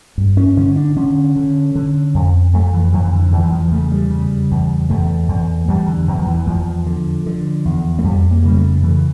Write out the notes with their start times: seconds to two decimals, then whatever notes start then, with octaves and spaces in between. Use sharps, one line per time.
0.18 G2
0.37 C#4
0.57 D3 C#4
0.76 D4
0.96 D3 C#4
1.36 D3
1.76 D3
2.14 F2
2.53 F2 A3
2.73 E3
2.93 F2 E3
3.13 D3
3.32 E2 E3
3.43 E3
3.52 F3
3.72 C#3 A3
3.92 G3
4.10 C#3
4.51 E2
4.90 E2 A3
5.29 E2
5.68 E2 G3
5.88 D3
6.08 E2
6.19 F3
6.27 E3
6.47 E2 F3
6.86 D3
7.26 D3
7.65 E2
7.99 A3
8.04 F2 G3
8.31 A#3
8.44 C#3 G3
8.57 A3
8.83 C#3 E3